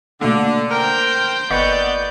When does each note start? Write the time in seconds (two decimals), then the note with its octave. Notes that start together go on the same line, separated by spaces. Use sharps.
0.21 B2 D3 A3 A#3 D4
0.71 A#4 C5 G5
1.50 G1 A#2 D3 B3 D5 D#5 C#6 G6